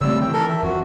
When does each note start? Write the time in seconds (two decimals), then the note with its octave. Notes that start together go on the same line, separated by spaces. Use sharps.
0.01 C#3 G3 A3 C4 E6
0.21 D#3 E3 G5
0.33 A4 A#4
0.50 E5
0.63 F2 F#4